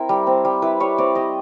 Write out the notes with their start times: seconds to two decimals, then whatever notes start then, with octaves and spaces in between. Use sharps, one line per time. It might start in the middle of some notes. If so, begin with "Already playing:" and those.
Already playing: C4 E4 A#4
0.09 G3
0.27 C4
0.45 G3
0.62 E4 B4
0.80 G3 C#5
0.98 C4 D5
1.15 G3 D#5